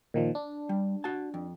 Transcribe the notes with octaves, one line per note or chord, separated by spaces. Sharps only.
A#2 D#3 F3
D4
G3
F#4 A5
F2